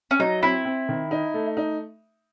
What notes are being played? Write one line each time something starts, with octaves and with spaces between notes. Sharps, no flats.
C#4
F#3 D#4
C4 E4
C4
D#3
D#4
A3
D#4